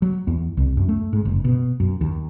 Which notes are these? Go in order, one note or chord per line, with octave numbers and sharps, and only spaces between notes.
F#3
E2
C2
F#2
A3
G#2
F#1
B2
F#2
D#2